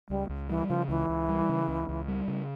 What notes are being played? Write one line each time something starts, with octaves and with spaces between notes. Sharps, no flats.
C#2 G3
C#2
E3 G3
C#3 F3
C#2 E3
C#2
G3
C#3
C#2
C#2
G3
C#3